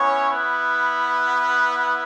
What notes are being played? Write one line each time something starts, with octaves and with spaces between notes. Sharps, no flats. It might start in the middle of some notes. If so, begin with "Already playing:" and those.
Already playing: B3 C#4 E4 C#5
B3 B4